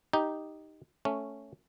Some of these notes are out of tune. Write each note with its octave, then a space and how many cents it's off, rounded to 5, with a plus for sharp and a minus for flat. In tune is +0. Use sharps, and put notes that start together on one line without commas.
D#4 +0 G4 +0
A3 +0 C#4 +0